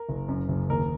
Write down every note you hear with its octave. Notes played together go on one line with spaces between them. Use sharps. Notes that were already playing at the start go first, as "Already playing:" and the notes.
Already playing: A#4
F#1
F#2
F#1
D#2 A#4